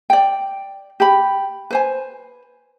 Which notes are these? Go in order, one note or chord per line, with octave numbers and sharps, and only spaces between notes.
D5 G5
G4 B5
B4 C5 G#5